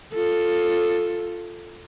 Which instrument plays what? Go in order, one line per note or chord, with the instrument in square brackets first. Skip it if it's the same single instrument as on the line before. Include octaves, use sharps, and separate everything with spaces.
[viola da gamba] F4 A4